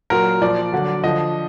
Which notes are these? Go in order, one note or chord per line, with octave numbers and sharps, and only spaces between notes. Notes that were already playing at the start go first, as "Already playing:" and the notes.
A#2 F#3 A#4
A#2 F3 D5
D3 F#3
D3 F3 D#5